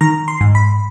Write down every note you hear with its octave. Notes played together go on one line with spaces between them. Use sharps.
D#3 A#5
C6
G#2
B5